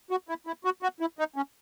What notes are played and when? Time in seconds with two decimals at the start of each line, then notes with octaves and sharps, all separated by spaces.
0.11 F#4
0.29 E4
0.47 E4
0.65 F#4
0.83 F#4
1.00 E4
1.19 D#4
1.36 C#4